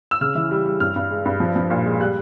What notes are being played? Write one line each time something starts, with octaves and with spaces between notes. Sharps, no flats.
E6
C#3 F6
E3
G3
G3
G2 F6
G2
G#3
G2
F3
F3
A#2
G#3
G3 F#6